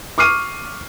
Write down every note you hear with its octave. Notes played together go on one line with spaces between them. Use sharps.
C#6 D6 F6 C7 D#7